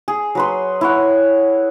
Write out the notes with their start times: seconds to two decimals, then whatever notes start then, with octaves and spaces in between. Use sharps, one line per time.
0.08 G#4
0.35 F#3 B4 C6
0.81 E4 C#5 F#5